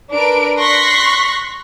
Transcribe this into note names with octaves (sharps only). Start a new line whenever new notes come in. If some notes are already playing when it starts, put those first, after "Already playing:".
D4 A#4 B4 D7
C6 C#6 F#6 A#6 B6